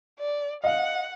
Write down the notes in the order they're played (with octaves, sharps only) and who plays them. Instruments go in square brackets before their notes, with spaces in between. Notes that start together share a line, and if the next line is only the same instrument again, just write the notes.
[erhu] D5
[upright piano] D#5 F5 [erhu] F#5